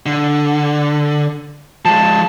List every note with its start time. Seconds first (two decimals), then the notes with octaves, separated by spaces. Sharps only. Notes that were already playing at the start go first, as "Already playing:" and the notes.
0.06 D3
1.85 F3 G#3 A5